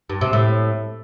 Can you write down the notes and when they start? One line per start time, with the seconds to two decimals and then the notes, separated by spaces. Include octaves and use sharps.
0.10 G2
0.21 C3
0.33 A2